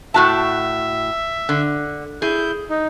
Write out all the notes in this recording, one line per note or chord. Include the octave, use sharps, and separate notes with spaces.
A2 F#4 E5 A5
D3
E4 G#4 G6
D#4